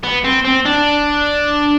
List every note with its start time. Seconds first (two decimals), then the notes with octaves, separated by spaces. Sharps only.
0.03 B3
0.24 C4
0.45 C4
0.65 D4